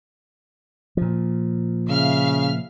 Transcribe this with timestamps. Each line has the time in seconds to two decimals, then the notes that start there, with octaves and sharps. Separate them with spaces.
0.97 A#2 F3
1.89 C#3 E5 F5 F6